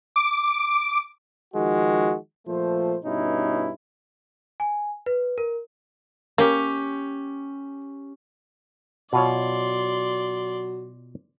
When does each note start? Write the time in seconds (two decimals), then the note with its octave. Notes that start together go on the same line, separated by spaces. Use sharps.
0.16 D6 D7
1.54 D#3 F3 G#3 F#4
2.47 A#2 F3 A3 C5
3.05 G2 B2 C#4 D#4 E4
4.60 G#5
5.06 B4
5.38 A#4
6.38 A#3 C#4 G4
9.13 B2 F#3 F4 C#5 D5 C6